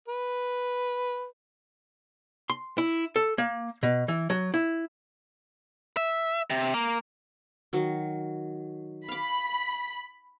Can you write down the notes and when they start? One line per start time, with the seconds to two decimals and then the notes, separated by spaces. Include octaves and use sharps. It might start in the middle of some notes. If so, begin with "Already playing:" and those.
0.08 B4
2.50 C6
2.78 E4
3.16 A4
3.38 A#3
3.83 B2
4.08 E3
4.30 F#3
4.54 E4
5.97 E5
6.50 C3
6.74 A#3
7.73 D#3 F#3
9.08 F5 B5 D6